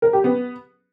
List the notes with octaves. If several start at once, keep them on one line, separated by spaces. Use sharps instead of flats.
A#4
G4
B3